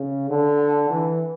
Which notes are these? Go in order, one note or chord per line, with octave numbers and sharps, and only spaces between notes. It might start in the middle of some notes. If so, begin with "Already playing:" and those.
Already playing: C#3
D3
E3